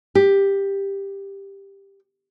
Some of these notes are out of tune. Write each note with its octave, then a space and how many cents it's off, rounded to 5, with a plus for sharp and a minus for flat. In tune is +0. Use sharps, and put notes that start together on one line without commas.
G4 +10